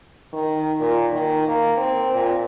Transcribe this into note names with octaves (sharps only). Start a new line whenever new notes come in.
D#3
A#2
D#3
A#3
C4
A#2